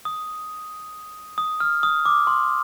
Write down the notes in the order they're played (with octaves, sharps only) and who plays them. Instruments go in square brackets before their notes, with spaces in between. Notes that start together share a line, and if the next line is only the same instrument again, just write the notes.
[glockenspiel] D#6
D#6
F6
D#6
D6
C6